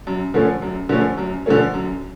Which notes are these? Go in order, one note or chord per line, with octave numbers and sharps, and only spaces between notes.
F#2
D3 F3 A3 C#4
F#2
D3 F3 A3 C#4
F#2
D3 F3 A3 C#4
F#2